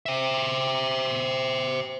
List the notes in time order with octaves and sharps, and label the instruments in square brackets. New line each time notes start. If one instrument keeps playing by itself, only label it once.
[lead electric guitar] C5 E5